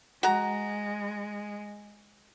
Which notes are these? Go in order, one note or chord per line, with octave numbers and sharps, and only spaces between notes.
G#3 F#4 A#5